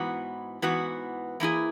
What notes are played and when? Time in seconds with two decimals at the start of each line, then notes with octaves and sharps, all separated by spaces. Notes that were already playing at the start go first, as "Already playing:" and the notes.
Already playing: G#2 E3 B3 F#4
0.62 G#2 E3 B3 F#4
1.40 E3 A#3 E4 G#4